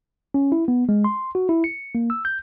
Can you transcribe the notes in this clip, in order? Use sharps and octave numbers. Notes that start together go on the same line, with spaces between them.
C#4
E4
B3
G#3
C6
F#4
E4
C#7
A#3
E6
G6